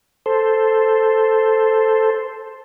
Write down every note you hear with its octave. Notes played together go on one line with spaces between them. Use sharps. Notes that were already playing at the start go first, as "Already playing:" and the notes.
A4 C5